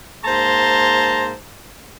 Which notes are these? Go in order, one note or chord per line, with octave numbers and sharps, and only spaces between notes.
G#2 A#3 C5 A5 A#5 C6